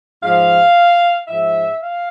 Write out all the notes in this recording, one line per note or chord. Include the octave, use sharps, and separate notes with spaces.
G#2 F3 F5
G#2 F3 E5
F5